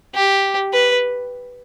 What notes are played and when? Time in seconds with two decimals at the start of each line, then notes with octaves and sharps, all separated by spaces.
0.15 G4
0.73 B4